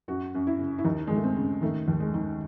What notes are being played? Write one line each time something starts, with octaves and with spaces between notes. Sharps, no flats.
F#2 F#4
F#2
E4
C#3
E4
D#2 D#4
G#3
D#2
A3
C4
C#3
D#3 A3
D#2
G#3
D#3